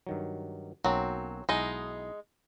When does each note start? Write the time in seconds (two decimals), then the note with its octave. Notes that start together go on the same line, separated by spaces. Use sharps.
0.07 G2 D#3 F#3
0.84 B1 F#3 A#3 C4 C#4
1.49 B1 G#3 D#4 E4 F#5